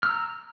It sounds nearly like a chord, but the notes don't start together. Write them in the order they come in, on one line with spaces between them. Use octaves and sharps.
F6 E6 A#5